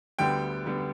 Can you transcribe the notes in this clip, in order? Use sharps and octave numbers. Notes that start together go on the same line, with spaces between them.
D2 D3 G3 B3 G5
D3 G3 B3